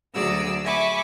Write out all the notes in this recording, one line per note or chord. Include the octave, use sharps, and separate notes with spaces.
D2 F#3 F#4 G#4 D5 E6
E5 G#5 B5 C#6 D6